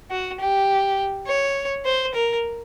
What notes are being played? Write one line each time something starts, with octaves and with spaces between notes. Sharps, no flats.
F#4
G4
C#5
C5
A#4